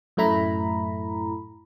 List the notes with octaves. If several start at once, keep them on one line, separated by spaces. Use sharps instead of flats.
F#2 A2 A3 E4 A#5 B5